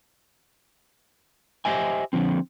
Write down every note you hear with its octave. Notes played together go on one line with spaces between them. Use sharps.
G4 C5 D#5 E5 G#5
D3 F3 C4